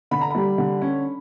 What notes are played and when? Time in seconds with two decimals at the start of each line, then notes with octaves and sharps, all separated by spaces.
0.11 D3 B5
0.21 A#5
0.31 G3 B5
0.58 D3
0.82 C#4